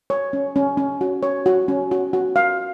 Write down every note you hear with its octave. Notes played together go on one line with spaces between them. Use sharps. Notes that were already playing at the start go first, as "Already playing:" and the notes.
C#5
C#4
C#4
C#4
F#4
C#5
F#4
C#4
F#4
F#4
F5